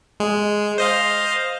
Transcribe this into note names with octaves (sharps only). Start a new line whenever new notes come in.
G#3
C5 D#5 F5